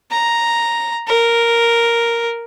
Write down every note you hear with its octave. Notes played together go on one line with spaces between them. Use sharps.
A#5
A#4